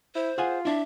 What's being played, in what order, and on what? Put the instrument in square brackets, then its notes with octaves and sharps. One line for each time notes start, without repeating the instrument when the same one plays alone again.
[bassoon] E4 [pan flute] C5
[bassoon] F4 [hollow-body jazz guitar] G#4 F#5 G#5
[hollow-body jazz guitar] D4 E4 [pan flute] E5